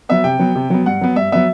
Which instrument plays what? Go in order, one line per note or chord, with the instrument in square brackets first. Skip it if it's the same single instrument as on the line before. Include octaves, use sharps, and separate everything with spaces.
[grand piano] F#3 B3 E5
C3 G5
F#3 B3
C3
F#3 B3
G2 F#5
F#3 B3
G2 E5
F#3 B3 E5